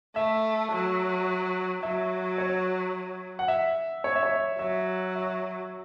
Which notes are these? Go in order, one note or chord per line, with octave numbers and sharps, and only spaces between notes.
A3 E5
F#3
F#3 E5
C#5
F#5
E5
C#5
E5
C#5
F#3 E5
E5